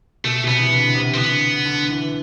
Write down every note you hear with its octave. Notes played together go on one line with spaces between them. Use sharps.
B2 A3
B2
C3 B3
E3
D3
C3
E3
C4
D3 B3
D3
E3